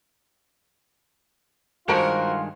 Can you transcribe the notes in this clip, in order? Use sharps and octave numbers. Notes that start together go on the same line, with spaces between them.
G2 D#3 G#3 F4 F#4 A#4 C5 A5